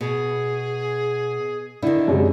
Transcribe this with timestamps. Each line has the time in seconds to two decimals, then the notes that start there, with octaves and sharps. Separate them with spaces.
0.01 B2 G#4
1.82 D3 D#3 E4
2.08 F#2 C3 G#3